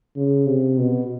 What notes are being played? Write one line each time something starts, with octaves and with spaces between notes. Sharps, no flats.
C#3
C3
B2